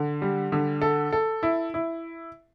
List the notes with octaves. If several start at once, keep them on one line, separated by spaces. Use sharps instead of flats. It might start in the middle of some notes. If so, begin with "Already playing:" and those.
Already playing: D3
G3
D3
A4
A4
E4
E4